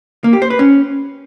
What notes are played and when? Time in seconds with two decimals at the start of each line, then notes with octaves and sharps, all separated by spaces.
0.24 A#3
0.33 G4
0.42 C5
0.50 B4
0.59 C#4